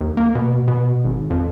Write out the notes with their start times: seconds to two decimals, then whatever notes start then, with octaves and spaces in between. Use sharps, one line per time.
0.01 D#2
0.17 A#3
0.35 B2
0.68 B2
1.04 G#1
1.30 F2